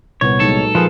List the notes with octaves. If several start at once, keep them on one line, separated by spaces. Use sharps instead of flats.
C2 A#2 B3 B4 C#5
F#3 G#3 D#4 A4
F3 G#4 A#4 B4